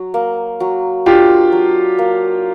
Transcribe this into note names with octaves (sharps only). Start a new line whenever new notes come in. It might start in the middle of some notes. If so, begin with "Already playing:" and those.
Already playing: F#3
A#3
F#3
D4 F4 G4
F#3
A#3